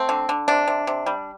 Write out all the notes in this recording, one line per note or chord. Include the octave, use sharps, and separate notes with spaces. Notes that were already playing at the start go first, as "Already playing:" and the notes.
Already playing: A3 C4
D3
D3
C3 D4
C3
C3
G3